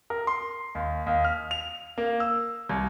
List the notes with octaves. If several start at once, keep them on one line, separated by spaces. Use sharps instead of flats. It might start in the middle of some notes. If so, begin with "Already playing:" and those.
A#4
C6
D#2
D#2
F6
F7
A#3
E6
C2